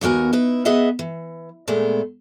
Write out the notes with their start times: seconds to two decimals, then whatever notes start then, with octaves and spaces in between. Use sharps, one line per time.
0.01 D#2 B3 F#4 A#4 G#5
0.33 D#4 E4 B4
0.65 B3 G#4 D#5 E5 F#5
0.99 E3
1.68 A#2 G#3 A3 B3